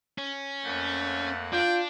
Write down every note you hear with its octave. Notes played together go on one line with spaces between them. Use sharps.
C#4
F2 A3 A#3 F#5
D4 F4 G5